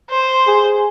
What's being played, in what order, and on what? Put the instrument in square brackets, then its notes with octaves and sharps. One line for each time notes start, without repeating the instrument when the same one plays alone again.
[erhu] C5
[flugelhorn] G#4